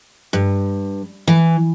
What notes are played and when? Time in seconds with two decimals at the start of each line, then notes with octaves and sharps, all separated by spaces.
0.33 G2
1.27 E3